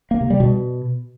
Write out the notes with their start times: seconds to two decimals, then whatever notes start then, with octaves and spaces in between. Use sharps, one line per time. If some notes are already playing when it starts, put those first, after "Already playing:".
0.11 A#3
0.21 C3
0.30 G3
0.40 B2